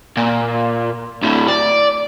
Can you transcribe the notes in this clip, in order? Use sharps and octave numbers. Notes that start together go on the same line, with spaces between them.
A#2
D2 A2
D5